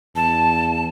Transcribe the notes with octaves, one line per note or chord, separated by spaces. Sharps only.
E2 A5